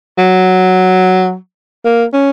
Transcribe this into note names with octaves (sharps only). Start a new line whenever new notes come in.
F#3
A#3
C#4